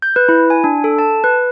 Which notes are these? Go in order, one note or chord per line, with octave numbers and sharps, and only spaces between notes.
G6
B4
E4
G#5
D4
A4
A5
B4